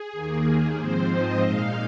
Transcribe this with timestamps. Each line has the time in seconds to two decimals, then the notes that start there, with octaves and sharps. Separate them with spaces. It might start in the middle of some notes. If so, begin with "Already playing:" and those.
Already playing: G#4
0.12 D#2 D#3 A#3
0.77 G#2 F3 C4 C5
1.09 D#5
1.41 A#2 G#3 D#4 F5